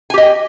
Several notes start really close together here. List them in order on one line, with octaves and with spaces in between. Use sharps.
G#5 G4 D#5 G5